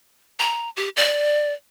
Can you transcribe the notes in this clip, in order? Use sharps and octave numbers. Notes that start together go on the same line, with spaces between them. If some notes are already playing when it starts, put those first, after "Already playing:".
A#5
G4
D5